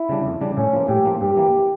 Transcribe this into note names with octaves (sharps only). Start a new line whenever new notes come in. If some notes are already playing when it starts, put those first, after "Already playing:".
Already playing: E4
C#3 G3 D4
F2
C#3 G3 D4
A2 C#4
F3 A#3
A2 G4
F3 A#3
G2 G4
E3 A#3